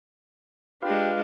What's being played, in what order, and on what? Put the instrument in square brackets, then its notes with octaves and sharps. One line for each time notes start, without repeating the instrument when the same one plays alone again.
[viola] G#3 D4 [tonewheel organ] F4 B4 F5 [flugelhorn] G4